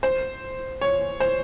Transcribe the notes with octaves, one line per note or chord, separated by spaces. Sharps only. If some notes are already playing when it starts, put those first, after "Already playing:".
C5
C#5
C5